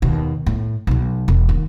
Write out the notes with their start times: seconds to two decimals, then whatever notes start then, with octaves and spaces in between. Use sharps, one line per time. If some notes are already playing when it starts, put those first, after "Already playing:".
0.02 D#2 B2
0.46 A2
0.87 B1 B2
1.28 E1
1.49 D#2